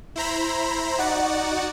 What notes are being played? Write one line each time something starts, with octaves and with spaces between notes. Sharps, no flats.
E4 C5 A#5 B5
D#4 F#4 D5 F#5